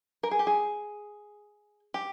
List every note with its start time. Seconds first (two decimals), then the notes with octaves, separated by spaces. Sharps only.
0.23 A#4
0.31 G#4
0.39 G4
0.47 G#4
1.94 G4